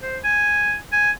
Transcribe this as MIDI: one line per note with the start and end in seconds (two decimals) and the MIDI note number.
0.02 0.18 72
0.24 0.75 80
0.92 1.11 80